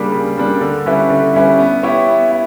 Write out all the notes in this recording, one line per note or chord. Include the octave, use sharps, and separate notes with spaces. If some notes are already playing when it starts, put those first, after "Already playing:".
Already playing: C#3 G3 A#3 D4
C#3
G3 A#3 D4
D3
G3 C#4 E4 B4
D3
G3 C#4 E4 B4
B3
E4 G4 C#5 E5
B3
E4